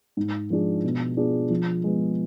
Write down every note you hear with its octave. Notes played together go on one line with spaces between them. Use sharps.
G#2
F3 G#3 D4 G#4
B2
B3 D4 F4 G#4
F3
G#3 B3